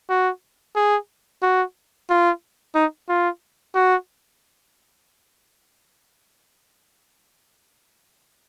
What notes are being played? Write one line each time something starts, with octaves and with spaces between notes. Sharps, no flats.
F#4
G#4
F#4
F4
D#4
F4
F#4